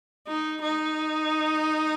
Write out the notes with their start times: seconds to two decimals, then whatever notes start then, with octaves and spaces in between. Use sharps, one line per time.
0.28 D#4
0.62 D#4